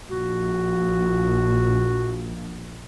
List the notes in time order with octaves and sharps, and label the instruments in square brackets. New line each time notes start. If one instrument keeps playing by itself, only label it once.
[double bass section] A#1 [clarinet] F#4